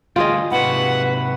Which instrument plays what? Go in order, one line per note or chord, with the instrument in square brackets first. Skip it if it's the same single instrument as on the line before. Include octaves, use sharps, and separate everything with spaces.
[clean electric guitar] D2 A#4 G5 [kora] F4 G#4 D#5
[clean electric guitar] G#2 C3 F#4 [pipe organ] B4 [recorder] F#5